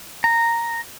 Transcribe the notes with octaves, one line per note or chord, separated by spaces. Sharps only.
A#5